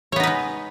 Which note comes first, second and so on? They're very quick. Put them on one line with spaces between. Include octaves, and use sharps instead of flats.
C#5 B3 D#4 B4 G#3